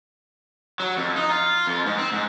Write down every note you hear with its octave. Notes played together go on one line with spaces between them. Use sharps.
F#3
F2
D#4
F4
F2
G#2
C4
G#2